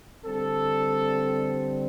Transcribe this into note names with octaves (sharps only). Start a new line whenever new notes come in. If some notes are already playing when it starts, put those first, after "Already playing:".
D3 G3 C4 A4